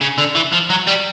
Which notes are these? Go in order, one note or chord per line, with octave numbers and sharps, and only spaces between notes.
C#3
D3
E3
F3
F#3
G3